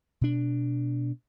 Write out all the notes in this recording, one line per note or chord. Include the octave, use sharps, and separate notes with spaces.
B2 D4